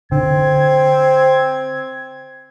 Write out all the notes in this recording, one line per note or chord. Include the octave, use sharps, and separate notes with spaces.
D3 C4 G#6